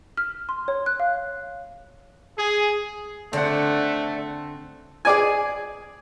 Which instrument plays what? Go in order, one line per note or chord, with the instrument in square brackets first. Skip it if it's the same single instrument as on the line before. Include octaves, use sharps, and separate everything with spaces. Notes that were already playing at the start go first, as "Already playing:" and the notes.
[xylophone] F6
C6
C#5
F#6
F5
[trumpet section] G#4
[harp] D3 [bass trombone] A3 [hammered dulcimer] C4 F#5 [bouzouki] A4 D5
[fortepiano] G#4 D5 G#5